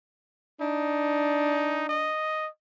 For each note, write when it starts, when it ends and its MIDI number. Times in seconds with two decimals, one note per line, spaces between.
0.61 2.09 62
0.61 1.85 63
1.89 2.48 75